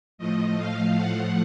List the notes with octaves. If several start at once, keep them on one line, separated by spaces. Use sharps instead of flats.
A2 F3 A3 D#5
F5
F#5